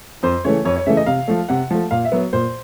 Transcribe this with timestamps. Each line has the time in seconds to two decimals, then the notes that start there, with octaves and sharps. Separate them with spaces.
0.23 F2 C5
0.45 C#3 E3 A3 C#5
0.65 F2 C#5
0.76 C#5
0.86 C#3 E3 A3 E5
0.97 D#5
1.06 C3 F5
1.28 F3 A3
1.48 C3 F#5
1.71 F3 A3
1.91 A#2 F5
2.05 E5
2.12 F#3 B3
2.33 A#2 C5